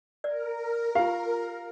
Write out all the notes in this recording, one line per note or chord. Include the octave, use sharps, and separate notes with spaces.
A#4 D5
F4 G4 F5